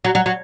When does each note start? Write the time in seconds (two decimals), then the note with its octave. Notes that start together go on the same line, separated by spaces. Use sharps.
0.05 F#3
0.15 F#3
0.26 F#3